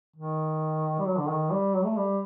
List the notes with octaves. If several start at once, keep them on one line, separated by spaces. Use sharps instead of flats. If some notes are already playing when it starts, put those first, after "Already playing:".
D#3
G3
F#3
D3
D#3
G3
F#3
A3
G3